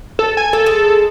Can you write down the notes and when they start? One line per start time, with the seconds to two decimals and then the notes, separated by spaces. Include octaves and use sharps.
0.19 A4
0.37 G#5
0.53 A#3 A4
0.66 G#3 G#4